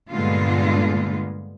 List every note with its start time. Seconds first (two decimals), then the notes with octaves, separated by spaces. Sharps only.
0.12 G2 A#2 D3 G#3 B3 F4